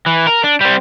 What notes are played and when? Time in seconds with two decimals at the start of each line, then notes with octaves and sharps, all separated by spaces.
0.06 E3
0.27 A#4
0.44 D4
0.61 G3 C4